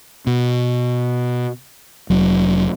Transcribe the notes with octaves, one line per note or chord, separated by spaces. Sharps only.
B2
F1 F#3